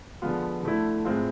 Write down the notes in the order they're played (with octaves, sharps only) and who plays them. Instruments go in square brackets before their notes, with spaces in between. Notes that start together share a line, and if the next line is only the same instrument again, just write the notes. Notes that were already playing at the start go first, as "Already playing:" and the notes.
[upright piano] D3 F3 G#3 B3 F4
D3 A3 E4
A2 G#3 C4 F4